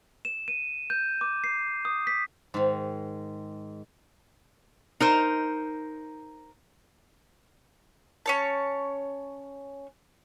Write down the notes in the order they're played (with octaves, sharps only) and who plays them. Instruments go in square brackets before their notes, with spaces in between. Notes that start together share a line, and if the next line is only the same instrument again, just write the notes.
[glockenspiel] E7
D#7
G6
D6
C7
D#6
B6
[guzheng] G#2 D#3
[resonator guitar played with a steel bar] D#4 A#4 C5
[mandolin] C#4 C#5 A5